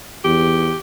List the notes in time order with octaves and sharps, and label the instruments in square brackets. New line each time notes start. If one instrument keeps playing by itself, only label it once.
[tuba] E2 [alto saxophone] G4